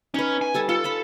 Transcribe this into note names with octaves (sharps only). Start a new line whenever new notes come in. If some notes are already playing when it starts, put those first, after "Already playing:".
C#4 D#4 B4
G#5
G3 A4 A5
F4 A4
C#5 A5 B5